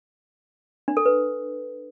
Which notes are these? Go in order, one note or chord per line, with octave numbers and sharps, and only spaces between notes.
D4
A4
B4